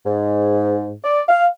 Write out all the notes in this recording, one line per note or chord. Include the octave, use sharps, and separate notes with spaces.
G#2
D5
F5